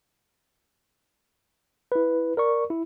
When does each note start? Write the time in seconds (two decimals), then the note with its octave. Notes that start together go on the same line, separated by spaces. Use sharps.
1.92 E4 B4
2.37 A#4 D5 C#6
2.70 E4